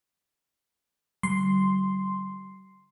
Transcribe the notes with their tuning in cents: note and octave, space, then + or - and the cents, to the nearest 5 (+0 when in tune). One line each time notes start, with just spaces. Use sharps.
D3 -5 G3 -40 C6 +0